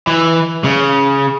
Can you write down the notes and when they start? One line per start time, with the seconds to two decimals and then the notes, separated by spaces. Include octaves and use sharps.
0.07 E3
0.64 C#3